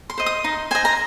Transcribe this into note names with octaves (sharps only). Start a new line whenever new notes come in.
C6
C5 D#5
D#6
D#4 C6
C5 D#5 G#5
A#5